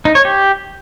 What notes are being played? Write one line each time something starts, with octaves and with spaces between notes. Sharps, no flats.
D#4
C#5
G4